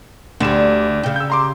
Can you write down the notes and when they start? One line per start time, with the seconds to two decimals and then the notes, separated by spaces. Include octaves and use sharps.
0.40 D2 D3 G3 E7
1.03 C#3 G4
1.16 E6 G6
1.30 A#5 C6 D6